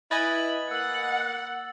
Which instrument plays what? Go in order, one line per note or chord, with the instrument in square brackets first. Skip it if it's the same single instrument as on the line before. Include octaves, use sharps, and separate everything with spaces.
[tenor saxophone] E4 [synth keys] B4 D#5 G#5 [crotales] A6 F#7
[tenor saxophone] A#3 [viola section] F#5 [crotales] E6